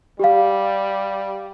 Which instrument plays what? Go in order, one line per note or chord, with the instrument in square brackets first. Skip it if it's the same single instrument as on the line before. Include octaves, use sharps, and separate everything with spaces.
[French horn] G3 [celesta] G4 F5